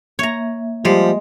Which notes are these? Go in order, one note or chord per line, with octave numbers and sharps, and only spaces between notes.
A#3 C#5 E5 A#5
F3 G3 G#3